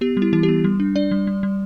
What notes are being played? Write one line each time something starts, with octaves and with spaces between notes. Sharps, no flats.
B3 G4
G3
E4
E3 E4
G4
B3
G3
D4
D4 D5
G3
G3
G3